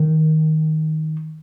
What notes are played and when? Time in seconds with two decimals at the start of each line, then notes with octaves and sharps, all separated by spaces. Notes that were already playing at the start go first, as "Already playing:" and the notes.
Already playing: D#3